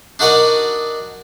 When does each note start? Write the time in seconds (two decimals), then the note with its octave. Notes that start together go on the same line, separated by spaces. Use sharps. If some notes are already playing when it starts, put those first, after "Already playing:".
0.19 D4 D#4 F#4 A#4 D5 D#5